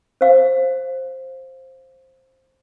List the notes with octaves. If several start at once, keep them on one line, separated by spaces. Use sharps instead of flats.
C5 F5